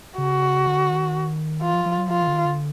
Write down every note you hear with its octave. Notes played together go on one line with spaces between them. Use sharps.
C#3 F#4
D3
D#3
E3 F4
F3
F3
F#3
F3 F4
E3
D3
D#3
D3